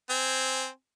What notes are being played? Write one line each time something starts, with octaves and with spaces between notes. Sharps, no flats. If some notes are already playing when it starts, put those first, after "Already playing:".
C4 G#5